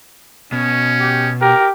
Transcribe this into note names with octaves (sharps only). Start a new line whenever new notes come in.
B2 C#4
G4
G4 A#4